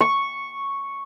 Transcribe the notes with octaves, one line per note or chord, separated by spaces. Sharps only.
C#6